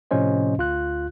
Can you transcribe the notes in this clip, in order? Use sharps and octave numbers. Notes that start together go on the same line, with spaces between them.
A2 C3 F3 C#4 C5 D#5
D2 F4 F#6